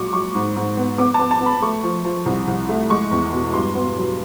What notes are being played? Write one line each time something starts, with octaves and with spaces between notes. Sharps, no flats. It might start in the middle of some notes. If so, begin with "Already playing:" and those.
Already playing: A#2 F#3 G#3 C#6 D6
F#3 C#6
G#2
G#2
B3
B3 D6
A5
B3
A5
B3
B5
A3 C#6
F3
F3
C2
C2
A3
G#3 C#6
E2
B2
G2 C6
B3
F#3